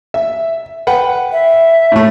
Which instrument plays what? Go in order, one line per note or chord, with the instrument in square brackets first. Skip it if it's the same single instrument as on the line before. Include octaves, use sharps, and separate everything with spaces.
[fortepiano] E5
B4 F#5 G5
[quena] E5
[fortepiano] A2 A3